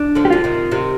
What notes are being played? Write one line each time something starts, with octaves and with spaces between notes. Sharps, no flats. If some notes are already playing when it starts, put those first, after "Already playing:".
Already playing: D4
D3 F3
G4
D3 F4
C3 D#3
C3 D#3